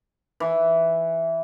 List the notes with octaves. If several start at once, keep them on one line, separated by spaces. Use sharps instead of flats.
E3